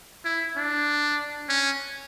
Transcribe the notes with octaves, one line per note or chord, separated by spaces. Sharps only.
E4
D4
C#4